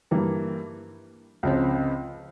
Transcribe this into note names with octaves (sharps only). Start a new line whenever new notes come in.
G2 E3 G3 A#3
C#2 C#3 F3 C4